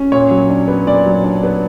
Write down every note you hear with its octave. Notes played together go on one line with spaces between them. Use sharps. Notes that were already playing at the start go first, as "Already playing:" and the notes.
Already playing: C#4
A#2 C#5
F#3
D4
B3
A#2 D5
F#3
D4
B3